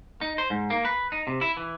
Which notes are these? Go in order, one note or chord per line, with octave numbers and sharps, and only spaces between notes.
D#4
C5
G#2
A#3
B4
D#4
C3
E4
E3